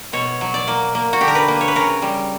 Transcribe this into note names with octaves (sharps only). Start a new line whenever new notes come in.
B2 C#5
F#3
D5
A#3
A#3
F#4
D3 G4
A#4
B4
A#3
C#5
B4
C#3 A#4
G3